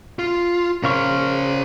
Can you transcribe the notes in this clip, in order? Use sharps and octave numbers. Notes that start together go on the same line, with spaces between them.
F4
C#3 A#4 C5 F5 C#6